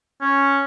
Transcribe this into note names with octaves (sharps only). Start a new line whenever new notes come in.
C#4